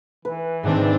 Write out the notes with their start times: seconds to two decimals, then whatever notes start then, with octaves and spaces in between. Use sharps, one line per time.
0.25 E3 B4
0.63 G#2 D#3 G#3 C4 D4